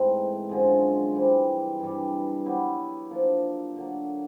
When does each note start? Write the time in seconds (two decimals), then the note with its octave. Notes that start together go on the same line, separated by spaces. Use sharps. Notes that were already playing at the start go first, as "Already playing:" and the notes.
Already playing: G#2 E3 A3 C4
0.49 F#2 D3 F3 G#3
1.15 C3 E3 G3
1.80 G2 E3 G3
2.46 F#3 B3 E4 G4
3.10 F3 A#3 D4
3.76 D3 F#3 A#3